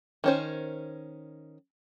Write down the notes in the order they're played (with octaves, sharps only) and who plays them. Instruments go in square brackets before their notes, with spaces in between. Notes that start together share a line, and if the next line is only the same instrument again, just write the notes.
[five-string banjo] D#3 C#4 C5